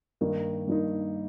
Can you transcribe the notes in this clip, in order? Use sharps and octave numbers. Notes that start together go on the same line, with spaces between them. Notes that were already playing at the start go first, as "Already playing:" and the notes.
G2 D#3 A#3 D#4
G2 D#3 A#3 D#4